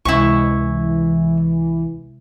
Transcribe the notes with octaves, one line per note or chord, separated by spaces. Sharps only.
C#2 C3 E3 G#3 E4 C#6